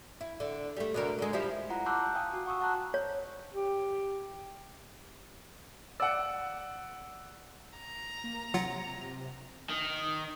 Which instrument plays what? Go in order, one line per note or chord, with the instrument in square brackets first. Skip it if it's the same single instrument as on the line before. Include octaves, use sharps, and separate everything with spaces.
[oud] E4
D3
G3 A3
B2 D3 A#4
D3 G#3
F3 G3 E4
[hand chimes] E4 F4 F#5 A#5
A5 C6 D6 E6 F#6 G6
F5 G5 G#5 D#6
F#4
F#5 C#6 D#6 E6
F#5 A5 A#5 F#6
[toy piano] C#5
[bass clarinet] G4
[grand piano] D5 F#5 [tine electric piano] E6
[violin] A#5
[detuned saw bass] A#3
[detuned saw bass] C3 [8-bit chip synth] F#3 F4 F#5
[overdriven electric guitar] D#3